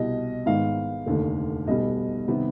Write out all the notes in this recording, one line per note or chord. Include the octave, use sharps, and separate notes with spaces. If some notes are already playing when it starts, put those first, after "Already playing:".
Already playing: C2 B2 G3 D#5
G#1 G#2 D#3 B3 F5
F1 D#2 D3
B1 B2 G3 B3 D#5
C3 D#3 G3 B3